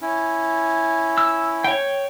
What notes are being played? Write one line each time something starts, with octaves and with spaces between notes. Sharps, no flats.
C#4 E4
E6
C#5 G5